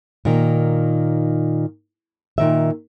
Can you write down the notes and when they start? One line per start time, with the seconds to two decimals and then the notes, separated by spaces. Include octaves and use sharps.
0.25 A#2 D#3
2.38 A#2 D#3 E5